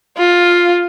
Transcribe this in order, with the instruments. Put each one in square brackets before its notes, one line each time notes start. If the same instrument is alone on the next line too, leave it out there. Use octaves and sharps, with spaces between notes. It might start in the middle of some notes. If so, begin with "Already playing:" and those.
[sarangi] F4